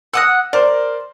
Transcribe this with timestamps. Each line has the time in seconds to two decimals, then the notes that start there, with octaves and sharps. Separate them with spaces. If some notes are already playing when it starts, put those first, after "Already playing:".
0.14 F#5 D#6 E6 F#6 A#6
0.53 A#4 C5 D5